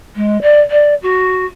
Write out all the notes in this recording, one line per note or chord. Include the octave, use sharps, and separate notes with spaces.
G#3
D5
D5
F#4